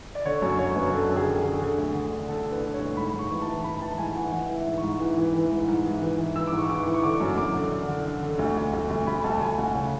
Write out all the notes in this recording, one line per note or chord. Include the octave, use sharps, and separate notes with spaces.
D5
D3 C#5
F#2 C#5
D3 C#5
F#2 B4
D3 A4
F#2
G#4
D3
G#4
D3
D3
D2
D3
D3
D3 A4
D3
B4
D3
C#5
D2
G#2 B5
G#2
C#6
E3
A5
E3
E3 B5
E3 A5
G#2 G#5
E3 F#5
E3 F#5
E3
E5
G#2
C#6
G#2
E3
E3
E3
G#2
G#2
E3
E3
E3
E3 E6
D6
G#2
C#6
E3 D6
E3
C#6
D3 D6
F#2
F#2 D6
D3
D3
D3
D3
D3
D2
D2
D2
D2
D2 B5
D2 A5
D2 G#5
D2 F#5
C#3